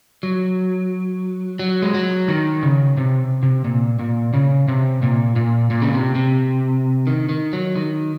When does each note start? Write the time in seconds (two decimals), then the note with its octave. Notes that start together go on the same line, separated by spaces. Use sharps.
0.23 F#3
1.59 F#3
1.82 G#3
1.94 F#3
2.28 D#3
2.63 C#3
2.97 C3
3.43 C3
3.64 A#2
3.99 A#2
4.33 C#3
4.68 C3
5.02 A#2
5.36 A#2
5.71 A#2
5.82 C#3
5.94 C3
6.15 C3
7.07 D#3
7.29 D#3
7.53 F#3
7.76 D#3